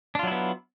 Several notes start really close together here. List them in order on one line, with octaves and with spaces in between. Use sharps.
D4 F4 F#3 E4 B3